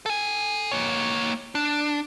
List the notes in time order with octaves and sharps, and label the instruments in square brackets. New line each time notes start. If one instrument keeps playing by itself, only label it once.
[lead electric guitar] A4 G#5
A#3 C#5
D4